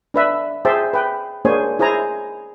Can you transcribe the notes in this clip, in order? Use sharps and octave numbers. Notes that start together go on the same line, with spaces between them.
D4 B4 E5
G#4 C5 E5 G5 A5
B4 G5
A#3 D4 G#4 C5 C#5 G#5
E4 G#4 C5 G#5 A#5